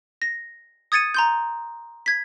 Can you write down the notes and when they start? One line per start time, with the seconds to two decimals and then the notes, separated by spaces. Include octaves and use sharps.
0.22 A#6
0.92 D#6 G#6 A6 C#7 D#7
1.14 A#5 C6 G6
2.06 G#6 B6